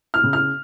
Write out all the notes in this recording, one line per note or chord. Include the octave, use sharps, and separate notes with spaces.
F6
C#3
F6